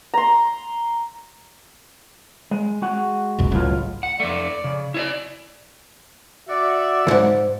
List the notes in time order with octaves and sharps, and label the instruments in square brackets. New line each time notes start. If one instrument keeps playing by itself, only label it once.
[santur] A#5 C6
[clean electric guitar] G#3
G#3 F#4 F#5
[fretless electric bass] D#1 C2 F#2
[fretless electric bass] G1 C#2 A2 [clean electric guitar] F#3 F4
[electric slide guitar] F#5
[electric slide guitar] F2 A3 [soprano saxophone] D5
[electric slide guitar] C#3
E4 C#5 D5
[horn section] F#4 D5 E5
[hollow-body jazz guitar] D#2 G#2